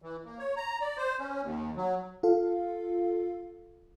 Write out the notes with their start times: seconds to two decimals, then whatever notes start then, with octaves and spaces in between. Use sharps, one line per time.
0.02 E3
0.25 A#3
0.39 C#5
0.57 A#5
0.81 D5
0.97 C5
1.19 C#4
1.42 D#2
1.76 F#3
2.23 F4 A4 F5